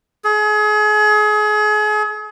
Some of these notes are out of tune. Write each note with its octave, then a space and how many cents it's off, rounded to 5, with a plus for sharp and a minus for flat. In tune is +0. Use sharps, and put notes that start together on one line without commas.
G#4 +35